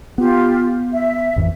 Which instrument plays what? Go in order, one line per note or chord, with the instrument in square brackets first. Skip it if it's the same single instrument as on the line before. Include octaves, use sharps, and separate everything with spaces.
[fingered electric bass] B3 [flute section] F4 G4
[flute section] E5
[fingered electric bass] A1 F2 E3